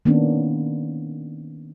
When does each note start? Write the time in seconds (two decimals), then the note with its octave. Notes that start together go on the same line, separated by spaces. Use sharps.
0.05 D#3 A#3 B3 C#4 D4